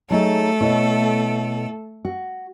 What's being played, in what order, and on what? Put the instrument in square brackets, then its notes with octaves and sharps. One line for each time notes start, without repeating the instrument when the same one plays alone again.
[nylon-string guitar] F#3 D#4 G#4 [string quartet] A3 A4
[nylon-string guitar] B2 E4 C#5
F#4